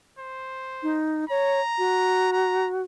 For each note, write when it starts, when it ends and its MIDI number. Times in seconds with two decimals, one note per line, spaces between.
0.19 0.99 72
0.83 1.25 63
1.30 1.60 73
1.30 2.33 82
1.78 2.83 66
2.33 2.68 82